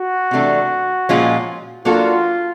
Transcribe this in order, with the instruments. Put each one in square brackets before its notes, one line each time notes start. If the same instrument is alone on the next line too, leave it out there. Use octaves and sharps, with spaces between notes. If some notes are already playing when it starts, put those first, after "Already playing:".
Already playing: [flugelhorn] F#4
[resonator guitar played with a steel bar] C3 E3 A3 D4
A#2 F3 G#3 C#4 F4
[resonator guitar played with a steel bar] F#3 A#3 D4 F#4 A4 [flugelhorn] F4